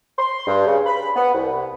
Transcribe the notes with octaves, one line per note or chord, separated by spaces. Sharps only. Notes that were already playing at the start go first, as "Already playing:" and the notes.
C6
G2
C#3
B5
B3
C2